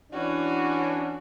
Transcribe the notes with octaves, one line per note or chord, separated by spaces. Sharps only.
E3 C#4 D4 F#4